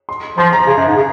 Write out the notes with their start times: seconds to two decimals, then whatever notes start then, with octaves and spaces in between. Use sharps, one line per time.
0.09 C6
0.38 F3 C6
0.53 A#5
0.67 C#3
0.77 F#2
0.87 G#2
0.96 C#3